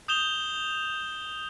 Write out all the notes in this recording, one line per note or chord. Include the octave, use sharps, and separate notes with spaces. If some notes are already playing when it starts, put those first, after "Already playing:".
D#6 G6 E7 F7 G7